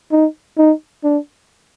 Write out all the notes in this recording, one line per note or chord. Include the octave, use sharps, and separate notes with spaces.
D#4
D#4
D4